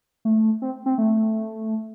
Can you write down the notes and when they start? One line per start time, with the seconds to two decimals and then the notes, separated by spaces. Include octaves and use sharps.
0.25 A3
0.62 C4
0.86 C4
0.98 A3